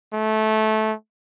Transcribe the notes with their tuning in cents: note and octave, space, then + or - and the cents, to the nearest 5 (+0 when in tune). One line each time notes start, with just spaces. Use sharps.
A3 -20